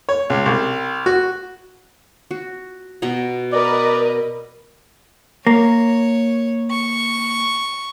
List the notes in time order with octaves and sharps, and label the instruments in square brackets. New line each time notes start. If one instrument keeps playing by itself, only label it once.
[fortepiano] C#5
C#2
C2
F#4
[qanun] F#4
B2 B3 A#5
[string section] A#4 B4 D#5 [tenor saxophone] D5
[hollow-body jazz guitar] A#3 [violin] C#5
[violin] C#6